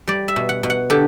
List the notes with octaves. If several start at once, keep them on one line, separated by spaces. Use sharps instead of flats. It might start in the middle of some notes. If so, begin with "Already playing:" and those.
G3 D5
E5
B2
F#5
B2
F#5
D3 G4